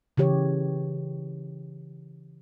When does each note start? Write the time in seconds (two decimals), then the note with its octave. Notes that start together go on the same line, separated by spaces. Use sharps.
0.17 C#3 E3 G4 C#5